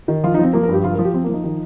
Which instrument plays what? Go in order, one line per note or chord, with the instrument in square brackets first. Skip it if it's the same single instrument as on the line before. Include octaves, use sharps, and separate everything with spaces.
[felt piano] D#3
F3 F4
D#4
F3 C4
F3 A#3
A#4
G2
G4
F3 F4
A#4
F3
G4
F3 C4
A#3
F3 D#4
D#3